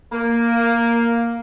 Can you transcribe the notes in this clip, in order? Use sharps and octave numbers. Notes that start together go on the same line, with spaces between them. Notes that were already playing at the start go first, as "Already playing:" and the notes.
A#3